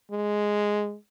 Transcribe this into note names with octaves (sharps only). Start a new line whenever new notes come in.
G#3